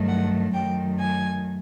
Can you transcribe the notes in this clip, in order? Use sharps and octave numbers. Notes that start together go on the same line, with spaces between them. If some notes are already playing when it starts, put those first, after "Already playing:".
Already playing: G2 D#3 F#3 A3
F#5
F#2 D#3 F#3 A3 G5
G#5